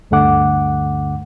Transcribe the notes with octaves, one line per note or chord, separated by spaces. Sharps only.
D2 G2 D3 A3 F#5 D6